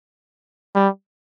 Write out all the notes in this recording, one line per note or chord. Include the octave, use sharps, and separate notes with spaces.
G3